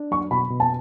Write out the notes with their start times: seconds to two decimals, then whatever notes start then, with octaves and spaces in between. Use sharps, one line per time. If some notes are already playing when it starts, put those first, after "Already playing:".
Already playing: D4
0.11 F#3 C#6
0.31 B2 B5
0.50 B2
0.60 A5